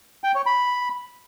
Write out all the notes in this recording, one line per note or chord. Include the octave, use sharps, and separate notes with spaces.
G5
C#5
B5